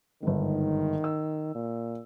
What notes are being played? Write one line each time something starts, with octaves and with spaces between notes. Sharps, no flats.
G1 G#2 D#3
E6
A#2